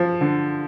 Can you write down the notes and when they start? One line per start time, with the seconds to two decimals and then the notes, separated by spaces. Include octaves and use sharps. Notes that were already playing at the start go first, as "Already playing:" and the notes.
Already playing: F3
0.21 D3